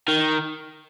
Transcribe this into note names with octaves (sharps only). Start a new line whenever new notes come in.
D#3